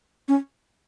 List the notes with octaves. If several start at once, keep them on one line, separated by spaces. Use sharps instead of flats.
C#4